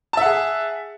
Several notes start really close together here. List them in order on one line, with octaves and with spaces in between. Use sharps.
A5 E5 F#5 G#4